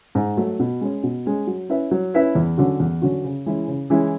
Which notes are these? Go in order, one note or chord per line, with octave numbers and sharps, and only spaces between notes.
G#2
F#3 A3
B2
G#3 C#4
B2
G#3 C#4
F#3
C#4 E4 B4 E5
F#3
C#4 E4 B4 E5
E2
D3 F#3 C#4 F#4
E2
D3 F#3 C#4 F#4
C#3
E3 G#3 C#4 E4
C#3
E3 G#3 C#4 E4